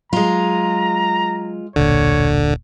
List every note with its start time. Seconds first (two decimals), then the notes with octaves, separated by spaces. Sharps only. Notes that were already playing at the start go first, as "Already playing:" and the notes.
0.13 F#3 G#3 F4 A#5
1.76 D#1 B1 A#2 D3 C#5